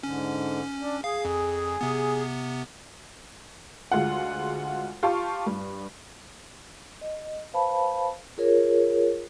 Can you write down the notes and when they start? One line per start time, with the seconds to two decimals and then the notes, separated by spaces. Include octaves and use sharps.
0.03 G#2 D3 C#4
0.81 D4
1.04 G#4 F5
1.25 F2
1.81 C3 B3
3.92 D2 G#3 F4 F#5
5.03 F4 G4 F5 A5 C#6
5.46 G2
7.01 D#5
7.53 B4 C5 F5 A5 B5
8.38 F4 G#4 A#4 C#5